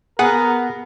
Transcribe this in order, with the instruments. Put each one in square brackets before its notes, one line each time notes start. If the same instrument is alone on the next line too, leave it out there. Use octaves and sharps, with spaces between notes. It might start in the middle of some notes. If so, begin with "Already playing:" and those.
[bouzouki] B3 [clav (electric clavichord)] G#4 [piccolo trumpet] A#4 [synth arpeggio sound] F#5